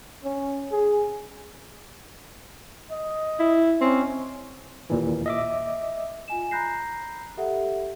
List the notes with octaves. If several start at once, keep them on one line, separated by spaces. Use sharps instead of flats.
C#4
G#4
D#5
E4
C4 C#4
D#2 A#2 E3
D#5 E5 D6
F4 G#5 E7
A#5 B5 F#6 G6 A#6 C7
G4 A4 E5 F#5